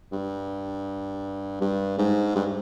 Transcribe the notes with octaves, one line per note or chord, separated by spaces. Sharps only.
G2
G2
G#2
G2